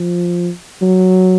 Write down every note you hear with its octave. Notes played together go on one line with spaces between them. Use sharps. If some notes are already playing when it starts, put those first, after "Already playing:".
Already playing: F3
F#3